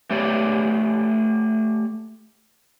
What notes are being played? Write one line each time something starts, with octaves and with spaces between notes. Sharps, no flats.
A3 G4 C#5 D5